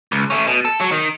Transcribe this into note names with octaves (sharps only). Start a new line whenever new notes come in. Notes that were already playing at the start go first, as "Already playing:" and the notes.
C#2
A3 C#4
B2
A4
F#3
D#3